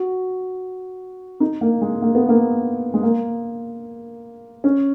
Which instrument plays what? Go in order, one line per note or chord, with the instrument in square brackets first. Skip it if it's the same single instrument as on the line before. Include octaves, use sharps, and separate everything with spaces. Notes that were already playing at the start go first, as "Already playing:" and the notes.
Already playing: [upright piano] F#4
D#4
A#3
G#3
A#3
B3
A#3
G#3
A#3
C#4